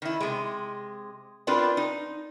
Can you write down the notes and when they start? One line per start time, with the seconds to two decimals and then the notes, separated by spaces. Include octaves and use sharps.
0.02 D#3 E4
0.20 C3 G#3
1.47 C4 D4 F4 A#4 B4
1.77 D#4